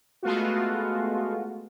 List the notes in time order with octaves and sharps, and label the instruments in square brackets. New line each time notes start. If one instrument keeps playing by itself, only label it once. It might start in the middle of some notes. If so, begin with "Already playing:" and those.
[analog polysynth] G#3 A3 B3 F4 F#4